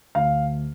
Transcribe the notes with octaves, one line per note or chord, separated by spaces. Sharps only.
D2 F5